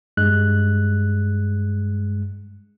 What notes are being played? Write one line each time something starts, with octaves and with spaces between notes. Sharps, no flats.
G2 G#3 F#6